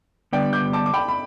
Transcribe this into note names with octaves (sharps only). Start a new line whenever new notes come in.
D3 G3 B3 D4 D5 G5
D6 G6
A5 D6
D6
G5 B5
B5